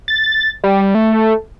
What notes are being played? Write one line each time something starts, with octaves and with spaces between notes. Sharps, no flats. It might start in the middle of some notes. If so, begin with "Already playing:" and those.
A6
G3
A3